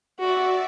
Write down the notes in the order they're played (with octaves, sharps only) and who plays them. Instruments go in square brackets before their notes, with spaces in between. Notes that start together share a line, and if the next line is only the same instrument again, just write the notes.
[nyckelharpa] F#4 [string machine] D5 E5